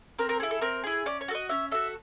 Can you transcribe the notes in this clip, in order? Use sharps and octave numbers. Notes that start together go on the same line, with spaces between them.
C4 A#4
A#4
E4 G#4 A4
A4
C4 A#4
E4 G#4
C#4 D5
C#5
F#4 A4
D#5
C#4 E5
F#4 A4 E5